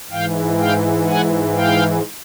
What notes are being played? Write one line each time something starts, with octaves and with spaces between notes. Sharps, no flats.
G#2 E3 F5 G5
F5 G5
F#5 G#5
F5 G5